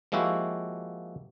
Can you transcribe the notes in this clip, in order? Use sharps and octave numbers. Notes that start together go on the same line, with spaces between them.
F3 G#3 A#3 E4 F#4 G4